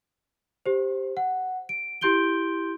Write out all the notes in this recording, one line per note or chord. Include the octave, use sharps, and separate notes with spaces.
G4 C5
F#5
D7
E4 G4 C6 G6 D7 G7